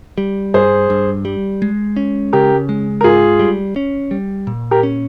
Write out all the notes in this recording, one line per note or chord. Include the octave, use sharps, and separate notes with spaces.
G3
G2 G#4 C5
G2
G3
G#3
C#4
C#3 G4 A#4
G#3
A#4
G#2 F4 G#4
G3
C#4
G3
A#2
G4 A#4
C#4